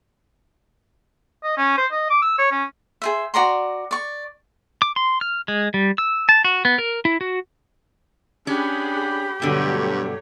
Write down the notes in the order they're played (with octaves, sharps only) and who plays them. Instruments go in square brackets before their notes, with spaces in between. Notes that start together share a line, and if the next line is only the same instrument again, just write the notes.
[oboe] D#5
C#4
C5
D#5
D6
E6
C#5
C#4
[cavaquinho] G#4 C5 E5
F#4 D5 A#5 C6
D5 C#6
[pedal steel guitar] D6
C6
F6
G#3
G3
E6
A5
F#4
B3
A#4
E4
F#4
[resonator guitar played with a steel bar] C#4 [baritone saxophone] D4 [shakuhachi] G4 [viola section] G#4 F#5 B5
[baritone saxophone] G2 [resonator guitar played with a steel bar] B2 D3 [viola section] F#3 A3 C#5